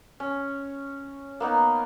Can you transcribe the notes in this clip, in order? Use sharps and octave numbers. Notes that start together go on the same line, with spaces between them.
C#4
A#3 B3 D#4